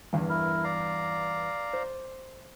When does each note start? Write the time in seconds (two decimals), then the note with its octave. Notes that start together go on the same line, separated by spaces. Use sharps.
0.13 E2 G2
0.29 E4 A#4
0.64 D5 F5 A#5
1.73 C5